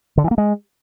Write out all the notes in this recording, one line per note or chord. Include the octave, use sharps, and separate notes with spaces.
D3
E3
A#3
G#3